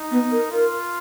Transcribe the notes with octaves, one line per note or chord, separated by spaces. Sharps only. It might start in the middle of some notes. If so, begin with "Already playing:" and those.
Already playing: D#4
B3
A#4
F4 A#4